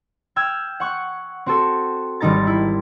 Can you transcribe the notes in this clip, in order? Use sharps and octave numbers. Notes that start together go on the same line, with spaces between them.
G5 E6 F6 G#6
F#5 C#6 F#6
C4 F#4 A4
G#1 D#3 G3 D#4 A#5 A6
E4